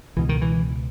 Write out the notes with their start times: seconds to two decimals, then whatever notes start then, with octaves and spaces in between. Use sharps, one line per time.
0.16 C#2 B2 E3
0.29 D#3
0.41 E3